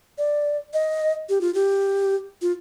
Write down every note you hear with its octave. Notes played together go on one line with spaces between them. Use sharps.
D5
D#5
G4
F4
G4
F4